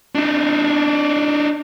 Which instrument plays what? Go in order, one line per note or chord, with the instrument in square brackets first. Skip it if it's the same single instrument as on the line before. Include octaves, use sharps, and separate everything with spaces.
[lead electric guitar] D4 D#4